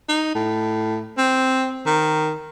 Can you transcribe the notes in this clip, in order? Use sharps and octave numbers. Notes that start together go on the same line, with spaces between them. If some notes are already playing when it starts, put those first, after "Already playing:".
D#4
A2
C4
D#3